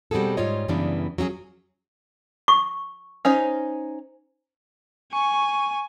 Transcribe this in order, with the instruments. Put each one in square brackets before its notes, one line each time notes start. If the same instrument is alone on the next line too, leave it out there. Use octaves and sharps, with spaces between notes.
[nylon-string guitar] B2 G3 C4 F#4 G#4 A4
G#2 G3 F4 C#5 D#5
F#2 C#3 E3 G3 B3 D4
F#3 C#4 F#4 G#4
[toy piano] C#6
[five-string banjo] C#4 D#4 C5
[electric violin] G#5 [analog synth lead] C#6